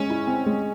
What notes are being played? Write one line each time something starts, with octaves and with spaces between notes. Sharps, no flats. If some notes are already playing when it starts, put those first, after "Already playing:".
Already playing: G#3 C#4
E4
C4
G#3